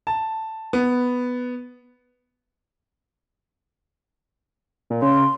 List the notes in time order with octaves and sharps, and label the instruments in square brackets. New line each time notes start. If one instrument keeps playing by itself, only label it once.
[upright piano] A5
B3
[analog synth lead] A#2
[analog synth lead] C#3 [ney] C6